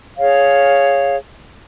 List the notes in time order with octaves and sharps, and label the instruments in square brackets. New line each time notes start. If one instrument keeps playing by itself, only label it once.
[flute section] G#4 C#5 F5